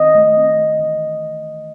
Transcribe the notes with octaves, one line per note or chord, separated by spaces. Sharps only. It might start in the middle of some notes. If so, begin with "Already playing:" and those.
Already playing: D#3 C4 D#5
A3
C4
A3
E3